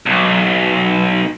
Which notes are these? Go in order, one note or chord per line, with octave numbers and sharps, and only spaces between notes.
B1